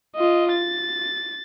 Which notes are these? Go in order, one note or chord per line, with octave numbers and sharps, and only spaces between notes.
F4 D#5
A6